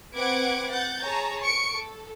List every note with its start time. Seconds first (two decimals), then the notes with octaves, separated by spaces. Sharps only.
0.15 C4 B4 F#5 D6 G#6 D7
0.70 F#5 G6 A6
1.04 G#4 C#5 A5 A#5
1.43 C#6 C#7 D7
1.73 A4